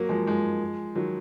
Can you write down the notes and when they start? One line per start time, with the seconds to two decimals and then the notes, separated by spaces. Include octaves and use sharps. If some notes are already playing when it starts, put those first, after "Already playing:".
Already playing: F#3 A#3
0.09 F3 G#3
0.26 F3 G#3
0.96 D#3 F#3